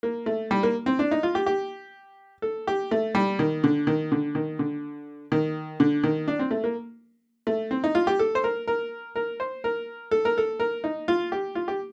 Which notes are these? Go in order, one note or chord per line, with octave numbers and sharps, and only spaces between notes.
A#3
A3
G3
A#3
C4
D4
D#4
F4
G4
G4
A4
G4
A3
G3
D#3
D3
D#3
D3
D#3
D3
D#3
D3
D#3
D4
C4
A3
A#3
A3
C4
D#4
F4
G4
A4
C5
A#4
A#4
A#4
C5
A#4
A4
A#4
A4
A#4
D#4
F4
G4
F4
G4